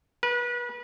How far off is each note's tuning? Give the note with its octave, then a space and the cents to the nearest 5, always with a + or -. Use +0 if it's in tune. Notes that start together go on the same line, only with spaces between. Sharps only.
B4 -30